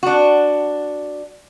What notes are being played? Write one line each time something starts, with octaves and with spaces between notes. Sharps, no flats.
D4 F#4